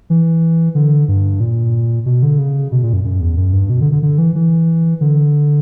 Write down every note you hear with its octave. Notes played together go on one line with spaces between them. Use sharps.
E3
D3
G2
A#2
B2
D3
C#3
B2
A#2
F#2
F#2
E2
F#2
G2
B2
D3
D3
D3
E3
E3
D3